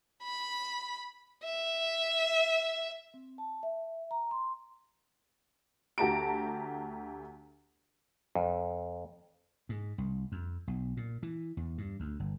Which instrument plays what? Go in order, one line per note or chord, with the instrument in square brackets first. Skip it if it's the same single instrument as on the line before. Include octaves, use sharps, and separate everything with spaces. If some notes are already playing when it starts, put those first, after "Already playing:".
[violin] B5
E5
[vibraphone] C4
A5
E5
A#5
C6
[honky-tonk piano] D2 F#4 G4 A5 A#5 D7
[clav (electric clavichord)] F2
[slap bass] G#2
C2
F2
B1
A#2
E3
E2
G2
D2
G1